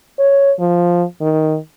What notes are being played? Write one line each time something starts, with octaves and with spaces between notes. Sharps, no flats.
C#5
F3
D#3